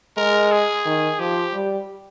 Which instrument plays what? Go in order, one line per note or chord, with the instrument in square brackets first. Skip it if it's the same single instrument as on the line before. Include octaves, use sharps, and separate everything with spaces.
[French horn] G#3 [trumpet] A#4
[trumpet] G#4
[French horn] D#3
[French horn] F3 [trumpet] G4
[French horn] G3